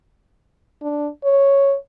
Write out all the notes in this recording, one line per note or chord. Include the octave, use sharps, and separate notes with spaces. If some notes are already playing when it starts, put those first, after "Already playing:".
D4
C#5